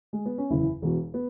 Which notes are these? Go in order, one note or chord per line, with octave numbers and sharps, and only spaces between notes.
G#3
B3
C#4
F#1 E2 C#3 E3 E4
E1 E2 B2
B3